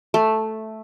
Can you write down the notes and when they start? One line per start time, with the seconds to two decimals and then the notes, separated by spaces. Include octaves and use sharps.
0.14 A3